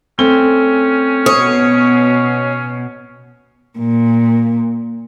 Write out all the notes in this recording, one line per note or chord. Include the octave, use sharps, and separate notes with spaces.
A3 C4 C#4 G7
B2 C#5 D#6
A#2